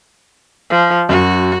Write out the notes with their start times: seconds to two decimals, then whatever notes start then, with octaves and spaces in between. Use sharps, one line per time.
0.70 F3
1.09 F#2 F#4